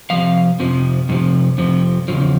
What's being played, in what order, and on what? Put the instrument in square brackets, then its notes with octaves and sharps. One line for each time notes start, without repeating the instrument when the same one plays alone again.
[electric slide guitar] F2 C3 F3 F5
F2 C3 F3
F2 C3 F3
F2 C3 F3
E2 C#3 F3